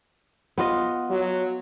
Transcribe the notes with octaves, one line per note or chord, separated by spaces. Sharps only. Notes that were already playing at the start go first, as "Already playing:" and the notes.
B3 F4 D#5
F#3